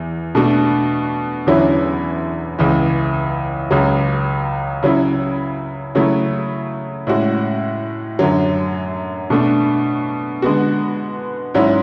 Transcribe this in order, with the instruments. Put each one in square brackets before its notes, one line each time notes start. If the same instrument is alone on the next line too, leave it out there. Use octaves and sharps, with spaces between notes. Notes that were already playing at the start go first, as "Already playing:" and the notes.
Already playing: [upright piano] E2
B2 A3 D4 F#4
E2 D3 F#3 C#4 E4
C#2 C#3 E3
C#2 C#3 F#3
C#3 F#3 C#4 E4
C#3 F#3 A3 E4
A2 G#3 C#4 F#4
F#2 D3 F#3
B2 A3 D4
D3 G#3 B3 F#4
G#2 F#3 C#4 E4